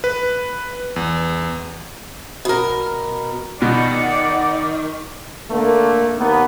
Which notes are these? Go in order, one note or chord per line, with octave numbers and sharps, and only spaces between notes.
B4
E2
B2 A#4
B2 D#3 D5 F#5
D3 A3 A#3
D#2 A#3 B3